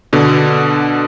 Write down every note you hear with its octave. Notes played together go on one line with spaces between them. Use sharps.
B2 D3